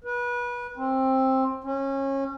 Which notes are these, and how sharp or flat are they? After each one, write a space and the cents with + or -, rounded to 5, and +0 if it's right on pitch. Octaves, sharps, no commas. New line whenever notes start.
B4 -25
C4 +15
C#4 -25